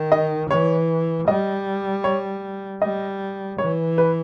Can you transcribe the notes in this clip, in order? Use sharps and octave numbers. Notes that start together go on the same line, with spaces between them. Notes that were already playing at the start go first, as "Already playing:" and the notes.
Already playing: D#3
D#5
E3 C#5
G3 D#5
C#5
G3 D#5
E3 C#5
B4